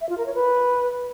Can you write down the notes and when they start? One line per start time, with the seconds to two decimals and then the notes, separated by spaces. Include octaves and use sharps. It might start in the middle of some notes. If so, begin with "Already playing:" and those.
0.01 E5
0.09 F4
0.18 A#4
0.26 C#5
0.35 B4